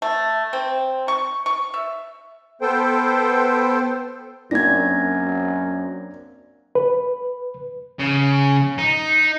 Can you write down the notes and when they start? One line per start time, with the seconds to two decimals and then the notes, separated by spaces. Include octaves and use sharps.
0.02 A3
0.53 C4
1.08 C#6
1.46 C#6
1.74 E5
2.61 B3 A4 C5 G5
4.51 F#2 A#3 C4 D4 G#6 A#6
6.75 B4
7.99 C#3
8.78 D#4